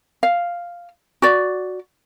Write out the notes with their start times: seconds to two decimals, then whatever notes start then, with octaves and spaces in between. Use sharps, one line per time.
0.23 F5
1.22 F#4 D5